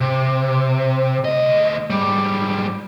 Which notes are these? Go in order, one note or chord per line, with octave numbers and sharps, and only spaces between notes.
C3
D2 D#5
G#2 G3